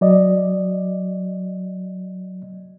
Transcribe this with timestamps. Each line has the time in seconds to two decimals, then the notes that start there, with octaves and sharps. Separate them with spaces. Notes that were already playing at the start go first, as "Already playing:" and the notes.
0.01 F#3 D5 D#5